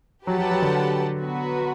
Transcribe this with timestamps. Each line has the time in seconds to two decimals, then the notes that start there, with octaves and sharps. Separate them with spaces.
0.27 F#3 G4 B4 F#5 A5
0.38 F#3
0.51 F#3
0.62 D3
1.21 B3 F#4 B4